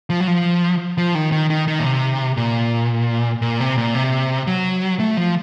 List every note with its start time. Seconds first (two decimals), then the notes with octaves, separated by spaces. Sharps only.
0.10 F3
0.20 F#3
0.28 F3
0.98 F3
1.15 D#3
1.32 D#3
1.50 D#3
1.68 D#3
1.79 A#2
1.84 C3
2.37 A#2
3.42 A#2
3.60 C3
3.78 A#2
3.95 C3
4.47 F#3
5.00 A3
5.17 F3